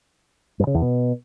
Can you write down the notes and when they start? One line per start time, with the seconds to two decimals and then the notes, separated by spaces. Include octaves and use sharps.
0.60 G2
0.67 C#3
0.74 E2
0.82 B2